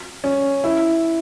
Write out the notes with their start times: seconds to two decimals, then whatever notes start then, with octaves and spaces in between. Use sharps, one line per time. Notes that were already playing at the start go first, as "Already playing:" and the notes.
0.24 C#4
0.64 E4